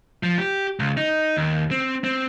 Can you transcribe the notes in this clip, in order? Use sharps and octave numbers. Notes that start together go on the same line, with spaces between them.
F3
G4
C#2
D#4
D#2
C4
C4